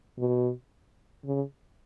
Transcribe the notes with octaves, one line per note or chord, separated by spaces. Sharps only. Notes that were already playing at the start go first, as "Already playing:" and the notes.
B2
C#3